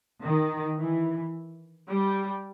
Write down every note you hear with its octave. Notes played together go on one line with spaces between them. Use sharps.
D#3
E3
G3